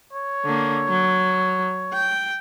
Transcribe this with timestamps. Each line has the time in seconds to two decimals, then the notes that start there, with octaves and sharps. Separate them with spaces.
0.13 C#5
0.45 D3 A#3
0.89 F#3
1.93 G5